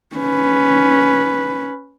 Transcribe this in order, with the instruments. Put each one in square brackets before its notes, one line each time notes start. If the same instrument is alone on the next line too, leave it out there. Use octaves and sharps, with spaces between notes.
[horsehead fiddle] C#4 B4